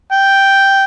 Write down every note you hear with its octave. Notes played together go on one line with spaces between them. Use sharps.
G5